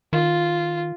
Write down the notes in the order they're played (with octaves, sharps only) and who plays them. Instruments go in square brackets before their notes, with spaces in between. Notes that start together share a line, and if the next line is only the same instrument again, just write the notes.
[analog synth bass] D#3 [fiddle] F4